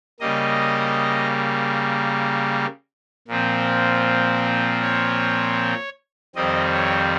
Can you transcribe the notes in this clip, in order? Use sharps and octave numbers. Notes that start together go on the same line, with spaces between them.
C#3 G3 A#3 D#5
A#2 F3 C4
C#5
F2 D#3 G3 C4 D#5
C#5